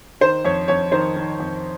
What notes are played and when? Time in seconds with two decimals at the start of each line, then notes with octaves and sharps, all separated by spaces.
0.21 D#3 C5
0.45 F2 C#5
0.68 F2 C#5
0.92 D#3 C5
1.16 D#3
1.40 F2